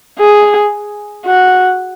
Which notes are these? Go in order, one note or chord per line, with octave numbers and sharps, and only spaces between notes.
G#4
F#4